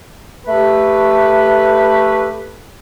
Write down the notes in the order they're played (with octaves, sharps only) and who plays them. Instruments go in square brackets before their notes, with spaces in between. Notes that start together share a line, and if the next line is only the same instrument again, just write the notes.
[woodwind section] A3 G4 B4